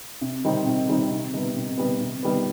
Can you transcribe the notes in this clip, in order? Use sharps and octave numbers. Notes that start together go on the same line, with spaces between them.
C3
D#3 G3 C4 D#4
C3
D#3 G3 C4 D#4
C3
D#3 G3 B3
C3
D#3 G3 B3
C3
D#3 G3 B3